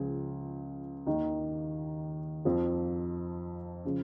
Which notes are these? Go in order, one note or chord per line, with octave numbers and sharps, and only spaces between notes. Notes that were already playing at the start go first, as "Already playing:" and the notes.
Already playing: C#2 C#3 F3 G#4
D#2 D#3 D#4
F2 F3
C#3 F3